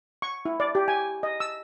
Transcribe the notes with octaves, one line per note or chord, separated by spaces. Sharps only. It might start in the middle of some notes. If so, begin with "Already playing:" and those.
C#6
E4
D5
G4
G#5
D#5
E6